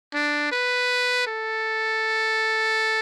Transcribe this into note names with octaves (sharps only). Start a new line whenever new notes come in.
D4
B4
A4